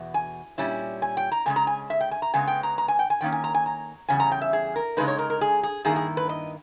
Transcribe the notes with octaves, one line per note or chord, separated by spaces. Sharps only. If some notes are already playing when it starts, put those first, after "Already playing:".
Already playing: E2 B2
G#5
A#2 G3 C#4 E4
G#5
G5
A#5
E2 C#3 G#3 G#5
A#5
G#5
E5
G5
G#5
A#5
C#3 G#3 B3 G#5
G5
A#5
A#5
G#5
G5
G#5
D#3 A#3 C#4 G5
G#5
A#5
G#5
A#5
E2 C#3 G3 C#4 G#5
A#5
G5
E5
G#4
A#4
C#3 G#3 D#4 B4
C#5
A#4
A#4
G#4
G#4
G2 D#3 A#3 E4 G#4
G#4
B4
D#5